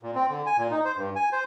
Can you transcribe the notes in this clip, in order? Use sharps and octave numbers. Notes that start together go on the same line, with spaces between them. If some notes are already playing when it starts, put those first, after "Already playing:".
A#2
C4
D3
G#5
A#2
D#4
C5
G2
G#5
C5